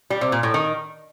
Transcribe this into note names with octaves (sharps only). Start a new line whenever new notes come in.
G3
C3
A#2
A2
D#3